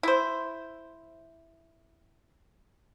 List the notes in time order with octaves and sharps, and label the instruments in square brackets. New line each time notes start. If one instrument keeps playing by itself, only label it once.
[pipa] E4 C5